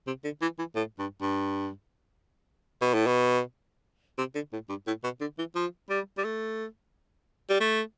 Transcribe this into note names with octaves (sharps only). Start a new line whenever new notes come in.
C3
D3
E3
E3
A2
G2
G2
B2
A2
B2
C3
D3
A2
G2
A2
B2
D3
E3
F3
G3
G3
A3
G3
A3